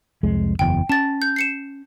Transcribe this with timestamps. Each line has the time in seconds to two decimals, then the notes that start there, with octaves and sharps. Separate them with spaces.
0.23 C2 F2 G#3
0.59 F#1 E2 G5
0.89 C#4 A5 A6
1.22 G6
1.36 C7 C#7 E7